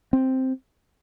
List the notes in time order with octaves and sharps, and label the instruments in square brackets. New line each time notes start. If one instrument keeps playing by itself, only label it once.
[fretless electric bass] C4